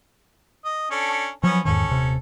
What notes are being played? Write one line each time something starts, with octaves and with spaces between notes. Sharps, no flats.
D#5
C#4 D4 A4
F3 F#3 B3 C#4
E2 G#2 D#3 C#4 A4
D#1 C3